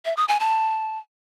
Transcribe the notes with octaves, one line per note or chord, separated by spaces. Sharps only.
E5
D#6
G#5
A5